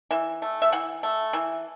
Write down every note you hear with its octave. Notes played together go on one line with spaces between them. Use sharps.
E3 E5
A3
E5
E3 F#5
A3
E3